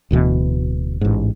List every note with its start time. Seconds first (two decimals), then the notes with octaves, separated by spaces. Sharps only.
0.11 D1 D2 B2 E3
1.01 A1 G#2